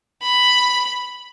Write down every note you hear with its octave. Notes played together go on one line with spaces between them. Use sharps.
B5